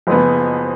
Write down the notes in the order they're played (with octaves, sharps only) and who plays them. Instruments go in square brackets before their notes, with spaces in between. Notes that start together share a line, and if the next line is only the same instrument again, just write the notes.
[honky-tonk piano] F#1 F2 F3 B3